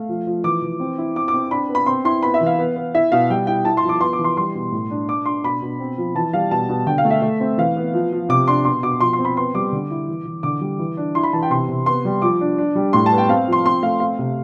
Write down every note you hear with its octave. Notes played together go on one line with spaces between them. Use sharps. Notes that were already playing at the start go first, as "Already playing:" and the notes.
Already playing: A3 F5
F3
F3
E3 D6
E3
C4
E4
C4 D6
D6
C4
D4 B5
B3
B5
C4 C6
E4 C6
B3 B5
E5
E3
F5
B3
B3
E4 E5
B2 F5
G3 G5
E4 G5
E4 A5
C6
F3
D6
B3 C6
D6
E3
C6
G3 C6
B2
A2
D4
D4 D6
D4 C6
B2 B5
B2
C4
F3
E3 A5
G3 F5
B2 A5
B2
D3 G5
F5
A3
E5
A3
C4
E3 F5
B3
F3
F3
C3 D6
D4 C6
B2 C6
B2 D6
F3 C6
C6
C4
B5
B3 C6
G3 D6
D3
E4
E3
E3
D3 D6
G3
E3
D4
E4 C6
B5
E3 A5
G5
C3 C6
C3
B3 C6
G3
F3 D6
D4
D4
G3
A2 C6
A5
B3
G5
C4 F5
F3 C6
C4 C6
A3 F5
C4 F5
C3